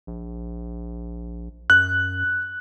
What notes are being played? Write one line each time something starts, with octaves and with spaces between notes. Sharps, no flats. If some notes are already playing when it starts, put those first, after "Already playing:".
A#1
F#2 F#6